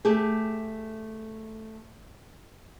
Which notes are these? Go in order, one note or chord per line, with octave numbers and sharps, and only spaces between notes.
A3 G4 G#4